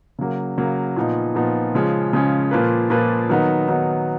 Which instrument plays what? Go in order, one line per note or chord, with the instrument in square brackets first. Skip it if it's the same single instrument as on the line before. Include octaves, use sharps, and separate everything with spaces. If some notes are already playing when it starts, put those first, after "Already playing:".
[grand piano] C#3 F#3 A#3
C#3 F#3 A#3
A#2 F3 B3 D#4
A#2 F3 B3 D#4
C#3 F3 G#3 C#4
C#3 F3 G#3 C#4
A#2 F3 A#3 F4 B4
A#2 F3 A#3 F4 B4
D#3 F#3 B3 D#4
D#3 F#3 B3 D#4